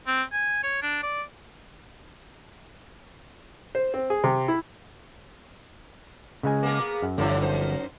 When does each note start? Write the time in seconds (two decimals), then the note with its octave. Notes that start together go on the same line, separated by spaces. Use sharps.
0.07 C4
0.32 G#5
0.63 C#5
0.82 D4
1.03 D5
3.75 C5
3.94 C4
4.10 G#4
4.24 C3
4.48 E4
6.43 C#3 G#3 G#5
6.63 A#3 B3 G#4
7.03 F#2
7.18 G1 A2 D3 E3 F3
7.40 F#2 D#4 C5